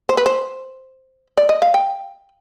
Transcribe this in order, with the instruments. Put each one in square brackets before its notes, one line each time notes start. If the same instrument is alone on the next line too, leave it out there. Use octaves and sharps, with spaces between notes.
[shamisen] C5
B4
C5
D5
D#5
F5
G5